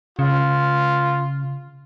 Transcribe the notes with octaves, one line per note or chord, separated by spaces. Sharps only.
C#3 F4